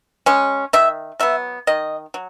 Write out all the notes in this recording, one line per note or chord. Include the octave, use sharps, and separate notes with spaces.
G#3 C#4
D#3 E5
F#3 B3 E5
D#3 D#5
F#3